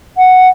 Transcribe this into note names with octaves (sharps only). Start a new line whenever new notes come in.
F#5